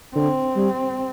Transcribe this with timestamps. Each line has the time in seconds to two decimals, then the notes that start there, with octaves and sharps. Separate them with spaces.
0.15 D3 C4
0.56 G3